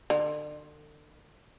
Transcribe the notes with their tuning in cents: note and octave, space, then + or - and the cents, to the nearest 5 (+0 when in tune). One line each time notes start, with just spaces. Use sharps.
D3 +35